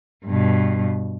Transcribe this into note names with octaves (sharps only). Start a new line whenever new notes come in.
G2 B2